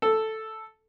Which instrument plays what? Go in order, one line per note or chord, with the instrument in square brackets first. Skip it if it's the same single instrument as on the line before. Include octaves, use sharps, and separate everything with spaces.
[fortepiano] A4